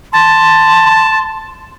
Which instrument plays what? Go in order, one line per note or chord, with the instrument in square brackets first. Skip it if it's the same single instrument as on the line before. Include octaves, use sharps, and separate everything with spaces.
[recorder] A5 [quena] C6